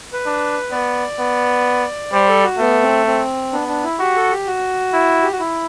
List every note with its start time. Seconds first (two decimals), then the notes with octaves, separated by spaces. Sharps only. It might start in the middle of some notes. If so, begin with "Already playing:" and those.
0.13 B4
0.26 D4
0.72 B3 D5
1.19 B3
2.12 G3 C5
2.28 A4
2.44 F#4
2.59 A3 B3
2.83 C4
3.07 C4
3.53 B3 D4
3.68 D4
3.84 E4
3.99 F#4 G4
4.16 A4
4.31 G4
4.47 F#4
4.93 E4
5.23 G4
5.32 F#4
5.40 E4